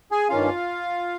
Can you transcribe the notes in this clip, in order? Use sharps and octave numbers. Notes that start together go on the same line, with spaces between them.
G#4 G#5
G2 D#3 A#3 C#4 F4 F5